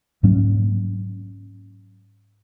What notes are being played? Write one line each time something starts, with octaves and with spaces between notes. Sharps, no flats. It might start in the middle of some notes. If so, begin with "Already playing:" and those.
G#2 F#3 A#3 C#4